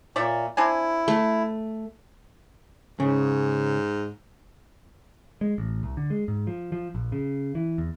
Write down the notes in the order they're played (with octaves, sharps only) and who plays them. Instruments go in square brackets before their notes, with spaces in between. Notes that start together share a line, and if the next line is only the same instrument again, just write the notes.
[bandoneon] A#2 [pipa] C#5 D5 E5
[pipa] C4 D4 G#5 [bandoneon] E4
[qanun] A3
[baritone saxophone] G#2 [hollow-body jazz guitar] C#3
[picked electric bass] G#3
A1
C2
D3
G#3
G#2
F3
F3
A#1
C#3
E3
E2